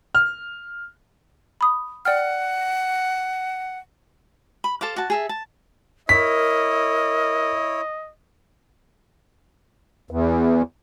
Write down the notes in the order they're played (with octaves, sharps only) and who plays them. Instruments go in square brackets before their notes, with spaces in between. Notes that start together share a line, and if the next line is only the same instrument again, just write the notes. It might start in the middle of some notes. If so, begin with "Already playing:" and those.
[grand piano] F6
[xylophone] B5 D#6
[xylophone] D5 G5 F6 [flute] F#5
[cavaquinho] B5
A4 C5 F5 D6
F#4 A5
G#4 A4 E5
A5
[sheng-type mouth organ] E4 C#5 [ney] A#4 [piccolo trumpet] D#5 [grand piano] B6
[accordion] E2